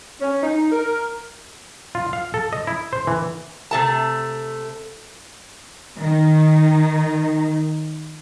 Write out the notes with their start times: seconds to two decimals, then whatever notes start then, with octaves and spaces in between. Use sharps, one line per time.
0.21 C#4
0.43 D#4
0.72 A#4
1.95 F4
2.13 F5
2.34 A4
2.53 D#5
2.67 E4
2.93 C5
3.07 E3
3.71 C3 A3 A5
6.01 D#3 D#4